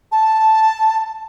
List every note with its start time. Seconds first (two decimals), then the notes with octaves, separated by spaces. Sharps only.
0.12 A5